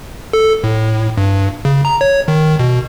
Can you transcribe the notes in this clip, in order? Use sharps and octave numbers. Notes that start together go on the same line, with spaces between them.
A4
A2
G2
C#3
A#5
C#5
D#3
B2